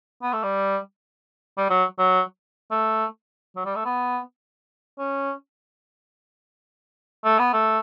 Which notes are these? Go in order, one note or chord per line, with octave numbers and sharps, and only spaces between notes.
B3
A3
G3
G3
F#3
F#3
A3
F#3
G3
A3
B3
C#4
A3
B3
A3